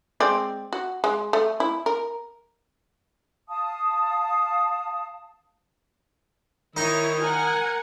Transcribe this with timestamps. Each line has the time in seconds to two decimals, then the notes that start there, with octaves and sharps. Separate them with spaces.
0.20 G#3 C4 D5
0.73 F#4
1.04 G#3
1.33 A3
1.60 E4
1.86 A#4
3.49 F5 A5 D#6
6.77 D#3 D#4 E4 C#5
7.21 A#4 F#5 G#5